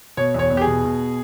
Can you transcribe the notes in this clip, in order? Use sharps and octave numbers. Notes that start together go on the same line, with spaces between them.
B2 C#5
E2 C#5
E2
G4
G#4
B2
B2